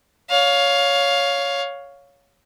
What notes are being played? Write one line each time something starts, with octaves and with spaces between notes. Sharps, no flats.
C#5 F5